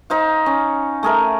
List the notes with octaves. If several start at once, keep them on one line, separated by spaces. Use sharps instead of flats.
D#4 C5 F5
C#4
A3 G#4 A#4 E5